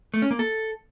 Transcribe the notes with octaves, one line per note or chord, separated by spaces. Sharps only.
A3
C#4
A#3
A4